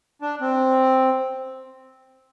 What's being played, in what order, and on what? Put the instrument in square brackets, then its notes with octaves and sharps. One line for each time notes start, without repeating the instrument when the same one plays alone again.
[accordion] D4
C4